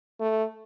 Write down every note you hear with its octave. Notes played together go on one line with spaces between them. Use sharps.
A3